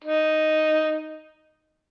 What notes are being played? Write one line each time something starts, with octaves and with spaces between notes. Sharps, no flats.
D#4